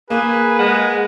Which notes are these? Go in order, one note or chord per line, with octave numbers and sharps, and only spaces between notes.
A#3 G#4 B4
G#3 F#5